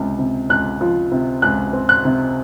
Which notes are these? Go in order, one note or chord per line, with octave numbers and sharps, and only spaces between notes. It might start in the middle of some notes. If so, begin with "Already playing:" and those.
Already playing: C#2 C3
C3
C#2 F#6
F3
C3
C#2 F#6
C4
F#6
C3